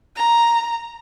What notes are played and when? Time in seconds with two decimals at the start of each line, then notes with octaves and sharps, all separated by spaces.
0.16 A#5